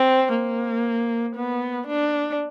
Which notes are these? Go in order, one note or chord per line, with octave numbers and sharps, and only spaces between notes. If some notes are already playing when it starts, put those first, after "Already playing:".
Already playing: C4
A#3
B3
D4